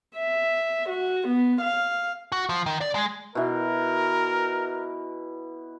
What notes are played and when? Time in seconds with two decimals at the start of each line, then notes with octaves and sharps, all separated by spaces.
0.17 E5
0.89 F#4
1.27 B3
1.61 F5
2.32 F#4
2.49 F3
2.66 D#3
2.81 D5
2.95 G#3
3.35 B2 E3 A#4